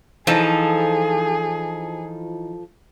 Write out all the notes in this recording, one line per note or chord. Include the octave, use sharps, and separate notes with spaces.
E3 F3 D#4 G#4 A4